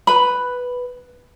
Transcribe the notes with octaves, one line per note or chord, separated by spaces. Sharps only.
B4 B5